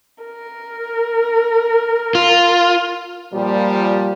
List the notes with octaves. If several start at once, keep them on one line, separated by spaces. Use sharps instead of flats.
A#4
F4
A#2 F3 G3